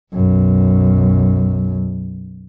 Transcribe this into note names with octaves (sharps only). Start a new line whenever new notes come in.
B1 F#2